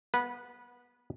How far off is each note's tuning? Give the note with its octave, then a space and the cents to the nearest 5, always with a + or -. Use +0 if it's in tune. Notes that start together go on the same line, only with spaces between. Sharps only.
B3 -20 B4 -15